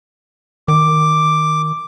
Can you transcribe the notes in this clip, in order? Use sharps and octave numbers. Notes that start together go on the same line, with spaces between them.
D#3 D6